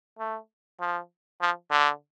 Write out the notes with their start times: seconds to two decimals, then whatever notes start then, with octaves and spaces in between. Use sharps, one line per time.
0.19 A3
0.80 F3
1.41 F3
1.71 D3